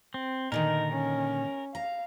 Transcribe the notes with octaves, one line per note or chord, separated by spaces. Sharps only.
C4
A#2 D3 D#3 D#4 A#4
C#4
F5 A#5